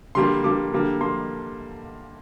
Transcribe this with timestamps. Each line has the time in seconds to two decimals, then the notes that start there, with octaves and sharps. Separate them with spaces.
0.15 D3 G3 A#3 C6
0.44 D3 G3 A#3 D6
0.72 D3 G3 A#3
1.01 A#3 C6